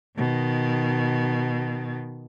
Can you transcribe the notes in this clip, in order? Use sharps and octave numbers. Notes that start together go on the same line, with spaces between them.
B2 D#3